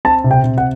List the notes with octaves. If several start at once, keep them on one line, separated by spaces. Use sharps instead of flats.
C4 A5
C3
G5
C3
F#5